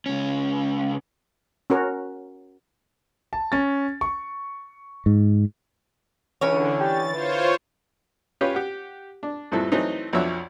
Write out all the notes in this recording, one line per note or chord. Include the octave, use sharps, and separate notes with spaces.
C#2 C#4
C#4 F#4 A#4
A5
C#4 A6
C#6
G#2
C#2 D3 E3 C#4 C#5
G4 A6
E3 F4 C5 C#5
C#4 F4 G4 B4 C#5
G4 F#5
D4
C#2 G2 A#2 C4 E4 A4
E3 F#3 A3 C4 D#4
B1 F2 D4 C#5 E5 F#5